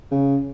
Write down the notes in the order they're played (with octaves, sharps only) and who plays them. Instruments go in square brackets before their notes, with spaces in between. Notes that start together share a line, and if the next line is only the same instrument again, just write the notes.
[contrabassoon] C#3